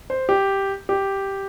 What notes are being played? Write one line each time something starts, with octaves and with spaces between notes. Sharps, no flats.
C5
G4
G4